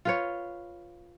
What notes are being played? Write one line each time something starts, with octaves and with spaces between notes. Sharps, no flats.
F4 B4 C#5